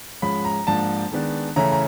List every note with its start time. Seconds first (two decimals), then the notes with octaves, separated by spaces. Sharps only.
0.22 G#2 F3 G#3 C#4 B5
0.45 A#5
0.67 G#2 F3 A#3 D4 A5
1.11 D#3 G#3 B3 D4
1.56 C#3 E3 A3 C#4 E4 A#5
1.72 A#5